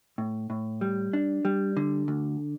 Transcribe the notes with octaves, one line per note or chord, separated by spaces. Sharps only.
A2
A2
G3
D4
G3
D3
D2